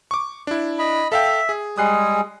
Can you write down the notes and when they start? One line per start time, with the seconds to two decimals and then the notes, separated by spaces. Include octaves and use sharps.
0.11 C#6 D6
0.47 D4 E4
0.79 D#5 B5
1.12 A4 E5 F5 G5
1.49 G#4
1.78 G3 G#3 G#4 D#6 F#6 C7